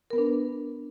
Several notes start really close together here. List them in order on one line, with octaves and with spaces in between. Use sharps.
A#4 B3 B4 D4